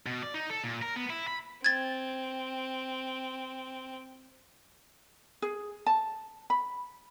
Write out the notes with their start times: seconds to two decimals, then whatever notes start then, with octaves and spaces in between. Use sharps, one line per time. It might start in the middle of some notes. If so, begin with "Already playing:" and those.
0.06 B2
0.22 D5
0.34 D#4
0.50 A4
0.64 A#2
0.82 A#4
0.96 B3
1.10 E4
1.28 B5
1.64 C4 G#6 A6
5.42 G#4
5.86 A5
6.50 B5